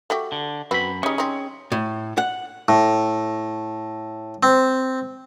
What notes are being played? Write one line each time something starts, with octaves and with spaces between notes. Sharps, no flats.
A3 F#4 G4
D3
F#2 C4 F#4 B4 B5
G3 C#4 D#4 G#4
C4 D#4
A2
F#5
A2
C4